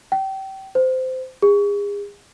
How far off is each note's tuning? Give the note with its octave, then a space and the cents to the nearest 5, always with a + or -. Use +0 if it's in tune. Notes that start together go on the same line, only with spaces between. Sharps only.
G5 -30
C5 -20
G#4 -35